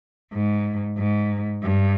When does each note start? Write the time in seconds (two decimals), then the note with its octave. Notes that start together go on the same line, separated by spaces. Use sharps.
0.33 G#2
0.98 G#2
1.63 G2